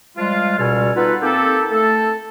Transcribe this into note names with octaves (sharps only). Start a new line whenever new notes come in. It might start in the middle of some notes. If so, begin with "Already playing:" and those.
F3 G3 G#3 F4
C#2 B2 G3 A4 G#5 F6
B3 D#4 F4 A4 B4
A#3 C4 D#4 G4 A4
A3 A4